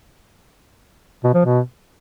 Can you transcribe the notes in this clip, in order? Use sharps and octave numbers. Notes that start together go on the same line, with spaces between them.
B2
F3
B2